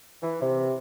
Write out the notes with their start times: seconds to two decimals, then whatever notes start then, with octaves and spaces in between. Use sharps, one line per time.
0.23 E3
0.42 C3